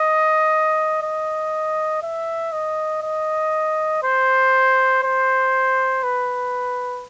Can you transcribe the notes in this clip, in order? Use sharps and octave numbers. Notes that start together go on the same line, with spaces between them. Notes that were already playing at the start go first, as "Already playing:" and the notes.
Already playing: D#5
D#5
E5
D#5
D#5
C5
C5
B4